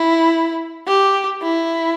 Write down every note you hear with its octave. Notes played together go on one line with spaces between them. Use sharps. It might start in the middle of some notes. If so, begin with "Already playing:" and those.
Already playing: E4
G4
E4